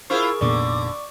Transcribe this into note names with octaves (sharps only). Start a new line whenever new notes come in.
E4 F4 G#4 A#4 C5 C#6
F1 D#2 A#2 D3 B3 D5 C#6 D6